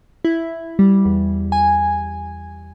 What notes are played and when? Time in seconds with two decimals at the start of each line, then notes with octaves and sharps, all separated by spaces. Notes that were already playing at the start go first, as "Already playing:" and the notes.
0.25 E4
0.79 G3
1.05 E2
1.52 G#5